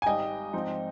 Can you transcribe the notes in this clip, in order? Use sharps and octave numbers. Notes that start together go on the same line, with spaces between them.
G#5
G#1 G#2 G3 D#5 G5
G#2 F3 C4 D#4